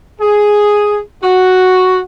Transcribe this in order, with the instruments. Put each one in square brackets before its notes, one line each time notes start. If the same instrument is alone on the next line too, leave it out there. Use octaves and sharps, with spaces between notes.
[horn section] G#4
F#4